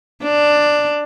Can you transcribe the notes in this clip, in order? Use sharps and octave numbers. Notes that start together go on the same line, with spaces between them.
D4